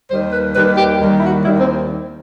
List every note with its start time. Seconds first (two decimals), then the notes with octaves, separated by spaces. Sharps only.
0.11 D#2 D#3 G3 C5
0.33 B4
0.56 D#2 D#3 G3 B4
0.78 G4
1.01 D#2 D#3 G3
1.19 E4
1.23 F#4
1.45 D#2 D#3 G3 E4
1.60 C4